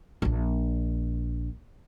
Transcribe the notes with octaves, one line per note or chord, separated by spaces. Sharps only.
A#1 D4